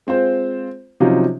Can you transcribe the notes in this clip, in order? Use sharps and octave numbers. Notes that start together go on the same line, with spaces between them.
G#3 C4 F4 C5
C3 F3 F#3 C#4 D#4 F4